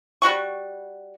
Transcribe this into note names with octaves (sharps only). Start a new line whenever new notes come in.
G3 F#4 F#5 C#6